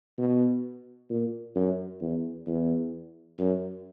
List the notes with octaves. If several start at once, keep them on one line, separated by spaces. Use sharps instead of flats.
B2
A#2
F#2
E2
E2
F#2